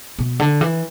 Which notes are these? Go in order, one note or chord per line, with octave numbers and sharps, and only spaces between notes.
B2
D3
E3